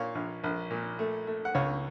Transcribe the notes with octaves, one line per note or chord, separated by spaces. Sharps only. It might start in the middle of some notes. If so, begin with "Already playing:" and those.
Already playing: A#2 C#5 F5
A#1
A#1
A#2
A3
A3
F#5
C#2 C#5 F5